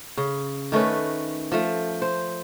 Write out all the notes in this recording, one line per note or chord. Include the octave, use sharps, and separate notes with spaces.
C#3
D#3 A3 C#4 B4
F3 A3
C5